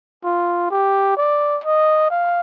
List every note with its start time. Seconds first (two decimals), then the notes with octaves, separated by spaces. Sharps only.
0.24 F4
0.71 G4
1.17 D5
1.64 D#5
2.10 F5